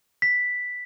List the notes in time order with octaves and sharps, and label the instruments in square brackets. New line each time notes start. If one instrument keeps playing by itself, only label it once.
[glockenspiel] B6